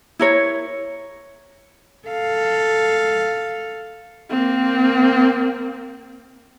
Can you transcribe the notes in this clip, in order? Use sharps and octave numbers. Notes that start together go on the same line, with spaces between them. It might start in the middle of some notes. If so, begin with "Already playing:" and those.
E4 A#4 C#5
A4 F5
A#3 C4